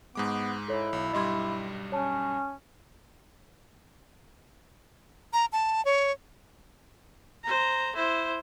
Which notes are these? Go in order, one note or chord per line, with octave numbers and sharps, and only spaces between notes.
G#2 G#3 B3 D6
E4 A4 C#5
B1
B1 G2 G3 D#5 C6 G#6
C#4 C#5 A5
A#5
A5
C#5
C5 A#5
E4 C5